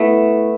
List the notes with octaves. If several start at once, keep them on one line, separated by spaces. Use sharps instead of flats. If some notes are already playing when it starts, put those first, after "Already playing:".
Already playing: A3 B3 E4